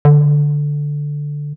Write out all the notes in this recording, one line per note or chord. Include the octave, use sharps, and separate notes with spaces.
D3